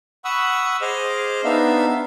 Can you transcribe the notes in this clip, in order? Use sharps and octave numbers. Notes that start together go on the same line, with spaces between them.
F#5 B5 C#6 D#6 E6
G#4 C5 D#5 D6 F6
B3 D4 D#4 E5 F5